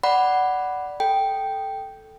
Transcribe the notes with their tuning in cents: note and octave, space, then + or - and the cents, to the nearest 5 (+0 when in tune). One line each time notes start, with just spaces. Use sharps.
D5 +0 F#5 +10 B5 +0
A4 +0 G5 +0